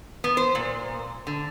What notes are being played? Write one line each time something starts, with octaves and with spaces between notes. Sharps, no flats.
B3
C5
A#2
D3